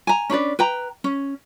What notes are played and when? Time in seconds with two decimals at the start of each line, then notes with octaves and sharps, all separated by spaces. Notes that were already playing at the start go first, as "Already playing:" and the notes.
0.07 G#5 A#5
0.30 C#4 D4 B4 D5
0.59 B4 G5 A#5
1.04 C#4